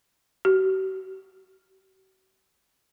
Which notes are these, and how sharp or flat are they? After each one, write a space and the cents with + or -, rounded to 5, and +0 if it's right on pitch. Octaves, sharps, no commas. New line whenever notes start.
F#4 +45